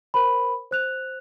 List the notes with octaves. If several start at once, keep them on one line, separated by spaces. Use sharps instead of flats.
A#4 C5 B5
C5 F#6 F7